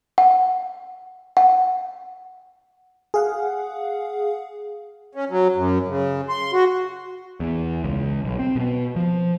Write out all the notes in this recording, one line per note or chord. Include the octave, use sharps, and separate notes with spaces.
F#5
F#5
G#4 F5 F#5
C#4
F#3
F#2
C#3
C6
F#4
E2
C#2
B1
C4
B2
F3